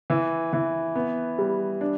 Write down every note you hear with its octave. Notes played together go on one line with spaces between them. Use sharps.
E3
E3
B3
G3
D4